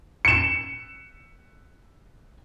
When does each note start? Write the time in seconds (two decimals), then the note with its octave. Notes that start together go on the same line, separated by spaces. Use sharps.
0.25 C#7 E7